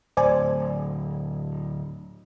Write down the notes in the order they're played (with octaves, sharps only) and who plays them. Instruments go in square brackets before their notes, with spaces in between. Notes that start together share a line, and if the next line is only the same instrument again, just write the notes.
[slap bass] D1 [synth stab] C5 D5 G#5